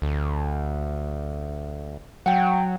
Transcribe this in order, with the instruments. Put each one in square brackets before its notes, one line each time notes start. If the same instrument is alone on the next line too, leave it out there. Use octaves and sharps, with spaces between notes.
[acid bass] D2
[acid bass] F#3 [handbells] F#5 G5